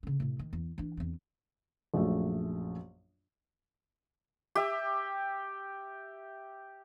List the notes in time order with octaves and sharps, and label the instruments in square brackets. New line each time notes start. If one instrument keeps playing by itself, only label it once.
[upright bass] C#3 C#4
A2 C3
D#3
E2
E3 D4
E2 C4
[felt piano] A#1 F#2 A3
[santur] G4 E5